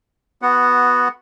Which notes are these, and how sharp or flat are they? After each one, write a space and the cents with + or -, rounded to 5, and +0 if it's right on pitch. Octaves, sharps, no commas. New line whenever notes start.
B3 +0 F#4 -10 F#5 +0